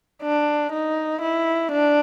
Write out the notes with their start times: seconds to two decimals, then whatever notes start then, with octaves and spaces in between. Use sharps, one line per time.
0.22 D4
0.72 D#4
1.21 E4
1.72 D4